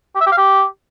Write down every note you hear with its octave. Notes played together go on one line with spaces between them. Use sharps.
G4
E5
G4
F5
G4